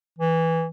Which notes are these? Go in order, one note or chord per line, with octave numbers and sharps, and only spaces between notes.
E3